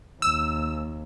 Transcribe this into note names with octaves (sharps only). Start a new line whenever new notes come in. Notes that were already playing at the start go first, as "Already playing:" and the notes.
D#2 E6